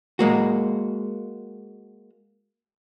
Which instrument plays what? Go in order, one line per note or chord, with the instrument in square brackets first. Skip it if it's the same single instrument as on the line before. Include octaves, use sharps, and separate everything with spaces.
[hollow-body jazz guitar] G#3 A#3 F#4